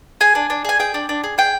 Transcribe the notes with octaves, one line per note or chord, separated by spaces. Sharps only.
G#4 G#5
D4
D4
G#4 G#5
G#4 G5
D4
D4
G#4
G#4 G5